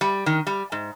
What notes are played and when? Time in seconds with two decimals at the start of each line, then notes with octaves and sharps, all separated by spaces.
0.01 G3
0.26 D#3
0.47 G3
0.72 G#2